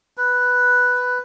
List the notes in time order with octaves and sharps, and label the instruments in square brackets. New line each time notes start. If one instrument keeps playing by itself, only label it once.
[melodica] B4